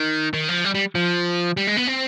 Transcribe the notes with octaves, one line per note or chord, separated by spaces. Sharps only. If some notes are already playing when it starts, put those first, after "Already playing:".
Already playing: D#3
D#3
F3
G3
G3
F3
G3
G#3
B3
C4